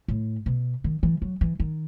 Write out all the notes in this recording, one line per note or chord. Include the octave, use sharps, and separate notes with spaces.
A2
B2
D#3
E3
F#3
E3
D#3